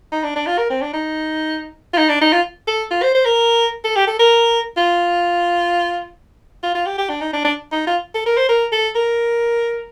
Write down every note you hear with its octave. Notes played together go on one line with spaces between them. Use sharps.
D#4
D4
D4
F4
A#4
C4
D4
D#4
F4
D#4
D4
D#4
F4
A4
F4
C5
C5
A#4
A4
G4
A4
A#4
F4
F4
F4
G4
G4
D4
D#4
D4
D4
D#4
F4
A4
A#4
C5
A#4
A4
A#4